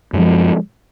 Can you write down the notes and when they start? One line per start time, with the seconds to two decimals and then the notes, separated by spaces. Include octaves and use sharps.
0.13 F#2
0.16 G#3
0.18 F3